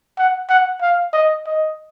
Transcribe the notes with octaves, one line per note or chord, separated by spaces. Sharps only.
F#5
F#5
F5
D#5
D#5